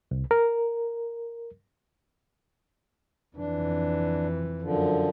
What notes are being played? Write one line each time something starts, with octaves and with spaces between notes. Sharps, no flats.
C2
A#4
F2 E3 D4
F#2 D3 F3